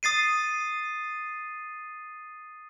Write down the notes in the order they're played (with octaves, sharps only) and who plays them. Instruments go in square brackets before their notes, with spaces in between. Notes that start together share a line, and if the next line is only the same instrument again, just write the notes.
[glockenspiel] D#6 A6 C7 D#7